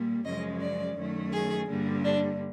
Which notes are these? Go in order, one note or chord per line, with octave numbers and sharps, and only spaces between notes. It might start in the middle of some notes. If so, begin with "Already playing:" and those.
Already playing: A#2 G3 A#3
F#2 C#3 F3 G#3 D#5
D5
F#2 D#3 F#3 A3
G#4
G2 D3 G3 A#3
D4